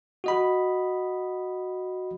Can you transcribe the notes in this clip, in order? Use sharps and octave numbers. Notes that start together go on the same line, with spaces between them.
F#4 D#5 B5